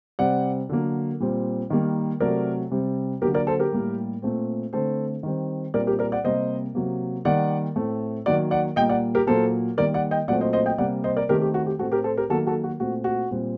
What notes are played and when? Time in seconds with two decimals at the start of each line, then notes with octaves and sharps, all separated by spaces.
0.19 C3 G3 C4 D5 F#5
0.69 D3 F#3 A#3
1.20 A#2 G3 C4
1.70 D#3 G3 A#3
2.20 C3 F#3 A3 A#4 D5
2.71 C3 G3 C4
3.22 D3 F#3 A#3 G4 A#4
3.34 A#4 D5
3.47 A4 C5
3.59 G4 A#4
3.73 A2 G3 A#3
4.22 A#2 A3 C4
4.73 D3 A3 C4 A4 C5
5.23 D#3 G3 C4
5.74 A#2 G3 C4 A#4 D5
5.87 G4 A#4
5.99 A#4 D5
6.12 D5 F#5
6.24 C3 G3 A#3 C5 D#5
6.75 C3 F#3 A#3
7.25 D#3 G3 A#3 D5 F#5
7.76 A2 A3 C4
8.26 D#3 F#3 A#3 D5 F#5
8.51 D5 F#5
8.76 A#2 G3 A#3 D#5 G5
8.89 D5 F#5
9.15 G4 A#4
9.27 A#2 F#3 A#3 A4 C5
9.78 D#3 G3 A#3 A#4 D5
9.94 D5 F#5
10.11 D#5 G5
10.28 A#2 F#3 A3 C4 D5 F#5
10.41 C5 D#5
10.53 C5 D#5
10.66 D#5 G5
10.78 C3 G3 A#3 D5 F#5
11.04 C5 D#5
11.16 A#4 D5
11.29 D#3 A3 C4 G4 A#4
11.42 G4
11.54 F#4
11.66 G4
11.79 A2 A3 C4 F#4 A4
11.92 G4 A#4
12.04 A4 C5
12.17 G4 A#4
12.30 D#3 F#3 A#3 F#4 A4
12.47 F#4 A4
12.64 F#4
12.80 A#2 A3 C4 F#4
13.04 F#4
13.31 A#2 G3 C4